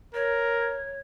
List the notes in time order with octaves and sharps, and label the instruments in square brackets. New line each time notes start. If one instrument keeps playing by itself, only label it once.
[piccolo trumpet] A#4 [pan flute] C#5